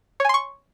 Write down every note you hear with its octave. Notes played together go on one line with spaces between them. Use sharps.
C#5 G#5 C6 C#6